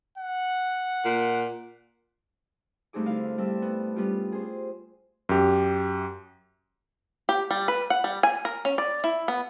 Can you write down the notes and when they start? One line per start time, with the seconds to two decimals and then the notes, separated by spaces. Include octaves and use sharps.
0.18 F#5
1.05 A#2
2.93 G2 A3 C4 D#4 G#4 D6
3.05 D3 D4 E4 F5
3.38 G3 C4 A4 E5
3.62 B3
3.96 G3 B3 C#4 F4 G4
4.32 G#4 C5
5.29 F#2 G4
7.29 G4
7.51 G3
7.68 B4
7.90 F#5
8.04 G3
8.23 G#5
8.45 A#4
8.65 C#4
8.78 D5
9.04 E4
9.28 B3